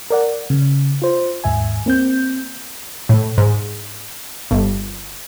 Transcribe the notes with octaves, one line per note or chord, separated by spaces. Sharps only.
A#4 D5 F#5
C#3
F4 C5
D#2 G#2 E5 G#5
A#3 C4 G6
A2
G#2
G1